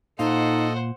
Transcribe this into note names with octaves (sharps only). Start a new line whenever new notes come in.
A#2 D#4 A4 C5 D#5 F5 F#5